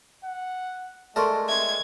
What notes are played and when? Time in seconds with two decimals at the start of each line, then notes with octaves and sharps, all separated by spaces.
0.24 F#5
1.16 G#3 A3 A#4 D5 A5 C6 C#6
1.49 E5 G#6